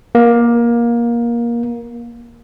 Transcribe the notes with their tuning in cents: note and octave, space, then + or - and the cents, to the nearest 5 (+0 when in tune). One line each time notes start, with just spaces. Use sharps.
A#3 +20